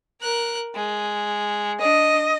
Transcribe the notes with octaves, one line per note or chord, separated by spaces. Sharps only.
A#4 F#6
G#3
D4 D#5